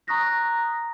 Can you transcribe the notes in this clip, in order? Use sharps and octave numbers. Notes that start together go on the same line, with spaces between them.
A#5 C#6 D#6 F#6 A#6 B6